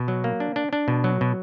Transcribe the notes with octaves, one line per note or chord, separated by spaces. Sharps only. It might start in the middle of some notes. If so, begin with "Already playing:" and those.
Already playing: B2
F#3
A#3
D4
D4
D4
B2
F#3
B2